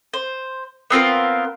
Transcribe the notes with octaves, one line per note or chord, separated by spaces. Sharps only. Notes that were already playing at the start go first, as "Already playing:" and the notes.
C5
B3 C4 F4 A#4